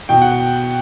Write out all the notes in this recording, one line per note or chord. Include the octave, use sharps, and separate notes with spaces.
B2 G5
F#5